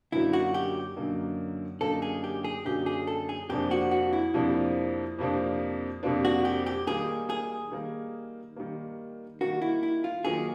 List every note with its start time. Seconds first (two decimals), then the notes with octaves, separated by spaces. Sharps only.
0.12 F#2 D3 F#3 A#3 D#4 E4
0.33 F#4
0.54 G4
0.96 F#2 D3 F#3 A#3 D#4
1.81 F#2 D3 F#3 A#3 D#4 A4
2.02 G#4
2.24 G4
2.44 G#4
2.65 F#2 D3 F#3 A#3 D#4 G4
2.86 G#4
3.07 A4
3.29 G#4
3.50 F2 C3 F3 A#3 D4 G4
3.71 F#4
3.91 F#4
4.13 E4
4.34 F2 C3 F3 A#3 D4
5.19 F2 C3 F3 A#3 D4
6.03 F2 C3 F3 A#3 D4
6.25 F#4
6.45 G4
6.66 G4
6.87 D#3 G3 A#3 G#4
7.30 G#4
7.71 D#3 G3 A#3
8.56 D#3 G3 A#3
9.41 D#3 G3 A#3 F#4
9.62 E4
9.83 E4
10.04 F4
10.25 D#3 F#3 A#3 G#4